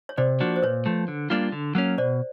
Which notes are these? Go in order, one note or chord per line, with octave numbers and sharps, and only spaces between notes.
C#5
C3 C5 D5
F3 A#3 D4 F#4
C5
A#2 B4 C#5
F3 A3
D3
G3 A#3 D4 F4
D3
F#3 A#3 C#4
B2 C5 D5